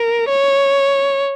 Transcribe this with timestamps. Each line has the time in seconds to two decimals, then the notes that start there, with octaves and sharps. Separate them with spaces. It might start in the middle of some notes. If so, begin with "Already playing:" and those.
Already playing: A#4
0.29 C#5